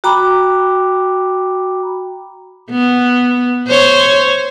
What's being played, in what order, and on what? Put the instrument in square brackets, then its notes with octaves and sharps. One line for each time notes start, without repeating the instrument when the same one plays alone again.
[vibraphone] F#4 G5 A#5 B5 D6
[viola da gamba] B3
C5 C#5